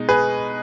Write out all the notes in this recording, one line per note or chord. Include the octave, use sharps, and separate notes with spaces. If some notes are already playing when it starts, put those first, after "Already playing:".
Already playing: B2 G#3 D#4
G#4 B4